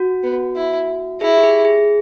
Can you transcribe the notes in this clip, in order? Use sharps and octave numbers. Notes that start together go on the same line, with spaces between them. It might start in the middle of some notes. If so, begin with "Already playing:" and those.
Already playing: F#4
B3
E4
E4 G#4
G4
G#4
G#4